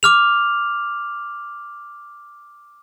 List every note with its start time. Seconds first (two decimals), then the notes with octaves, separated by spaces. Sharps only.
0.03 D6 F6 F7